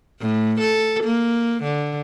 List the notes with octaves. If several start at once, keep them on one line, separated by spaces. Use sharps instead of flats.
A2
A4
A#3
D3